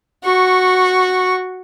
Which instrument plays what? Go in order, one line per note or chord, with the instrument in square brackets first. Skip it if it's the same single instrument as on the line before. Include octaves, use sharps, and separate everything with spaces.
[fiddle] F#4 C#6